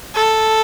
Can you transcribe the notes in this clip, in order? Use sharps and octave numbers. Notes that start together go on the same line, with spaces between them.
A4